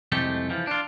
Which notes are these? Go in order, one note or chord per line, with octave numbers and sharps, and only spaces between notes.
C2 F2 G#3 A3 G4
E3 F3
D4 F4